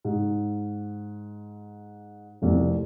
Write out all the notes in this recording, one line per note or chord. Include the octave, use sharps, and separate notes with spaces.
G#2
F1 C2 F2